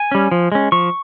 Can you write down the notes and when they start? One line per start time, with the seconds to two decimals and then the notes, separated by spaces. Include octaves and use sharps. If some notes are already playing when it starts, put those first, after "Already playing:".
Already playing: G#5
0.12 G3 C#4
0.31 F3
0.52 G#3 C#4
0.72 F3 C#6